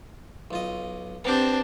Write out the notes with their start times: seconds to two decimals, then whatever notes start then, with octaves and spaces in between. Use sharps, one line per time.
0.51 B1 F4 D#5
1.24 B3 C4 D4 G4